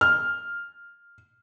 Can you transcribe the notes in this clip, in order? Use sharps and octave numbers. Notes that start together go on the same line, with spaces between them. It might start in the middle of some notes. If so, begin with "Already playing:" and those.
F6